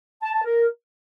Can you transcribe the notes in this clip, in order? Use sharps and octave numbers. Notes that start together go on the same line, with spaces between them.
A5
A5
A#4